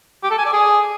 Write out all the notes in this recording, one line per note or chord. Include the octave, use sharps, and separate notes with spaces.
G4
A4
G#5
D5
G#4